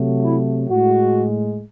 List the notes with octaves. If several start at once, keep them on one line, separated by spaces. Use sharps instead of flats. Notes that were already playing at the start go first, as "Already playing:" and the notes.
Already playing: C3 F#3 A3
E4
A2 G#3 F#4